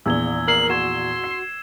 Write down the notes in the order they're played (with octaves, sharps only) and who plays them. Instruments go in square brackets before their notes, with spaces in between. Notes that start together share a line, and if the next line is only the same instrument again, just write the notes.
[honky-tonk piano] A#1 E2 [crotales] E6 G#6 G7
[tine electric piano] A#4 C7 [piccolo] F#7
[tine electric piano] F#4 [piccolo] C6 [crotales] G#6 E7
[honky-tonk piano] C7